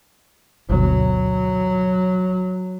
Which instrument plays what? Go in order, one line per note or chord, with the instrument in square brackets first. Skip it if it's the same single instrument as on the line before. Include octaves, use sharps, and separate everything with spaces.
[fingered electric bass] G1 D2 B2 [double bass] F#3